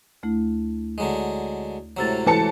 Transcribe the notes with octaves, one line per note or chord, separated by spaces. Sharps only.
D2 A3 E4
D3 F#3 G#3
A2 C3 F#3 G#3 E6 A6
E3 G#3 E4 A4 A5 C#7